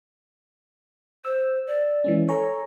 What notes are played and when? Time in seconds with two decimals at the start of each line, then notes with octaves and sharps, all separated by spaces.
1.25 C5 E6
1.67 D5
2.04 E3 G#3 C#4
2.29 A4 C#5 G#5 A#5